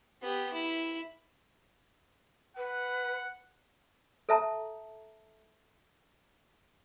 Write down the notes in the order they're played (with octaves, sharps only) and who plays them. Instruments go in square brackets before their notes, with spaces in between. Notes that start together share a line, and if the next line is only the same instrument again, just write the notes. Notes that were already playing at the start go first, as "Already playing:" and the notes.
[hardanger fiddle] B3 G4
E4
[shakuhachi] B4 [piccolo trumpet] F#5
[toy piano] A4 E5 A5 A#5